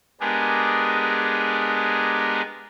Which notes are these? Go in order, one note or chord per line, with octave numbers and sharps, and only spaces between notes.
G#3 B3 D4 G4 G#4 A#4